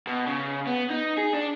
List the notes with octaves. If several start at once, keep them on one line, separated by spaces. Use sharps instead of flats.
B2
C#3
B3
D#4
G#4
D4